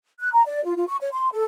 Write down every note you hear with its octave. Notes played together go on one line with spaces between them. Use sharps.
F#6
A#5
D5
F4
F4
C#6
C#5
C6
A4